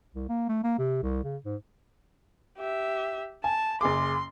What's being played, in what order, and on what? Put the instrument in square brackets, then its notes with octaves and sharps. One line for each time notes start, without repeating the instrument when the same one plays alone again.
[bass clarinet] C2
A#3
A3
A#3
C3
C2
C#3
G#2
[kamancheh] G4 E5
[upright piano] G#5 [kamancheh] A5
[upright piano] F#1 G#4 D6 [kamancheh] C6